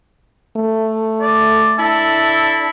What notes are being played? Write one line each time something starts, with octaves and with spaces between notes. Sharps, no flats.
A3
D5
D4 E4 A4 A5